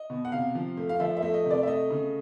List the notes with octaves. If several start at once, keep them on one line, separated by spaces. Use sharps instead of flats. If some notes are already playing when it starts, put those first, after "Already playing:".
Already playing: D#5
B2
F#5
C3 F5
F3
A3
F5
F3 E5
E5
A3
D#5
C3
D5
E5
A3 D#5
C#3